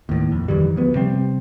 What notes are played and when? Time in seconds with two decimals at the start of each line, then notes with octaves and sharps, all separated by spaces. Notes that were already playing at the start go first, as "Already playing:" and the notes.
0.09 D#2 A2
0.32 A#1 F2
0.48 F2 D#3 E3 G3
0.76 D2 F3 B3
0.95 C3 G3 C4